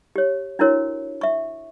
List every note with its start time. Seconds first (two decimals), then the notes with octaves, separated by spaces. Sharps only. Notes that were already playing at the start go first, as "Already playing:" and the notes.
0.16 G4 C#5
0.59 D4 E4 F#4 A#4 C#5
1.21 E5 C#6